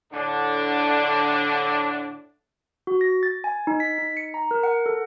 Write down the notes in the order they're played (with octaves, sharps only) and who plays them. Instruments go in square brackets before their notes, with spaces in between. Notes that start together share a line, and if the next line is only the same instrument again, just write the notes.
[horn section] A2 D3 D4
[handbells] F#4
A#6
A6
G#5
D#4
B6
D#4
C#7
A#5
A#4
F#5
A4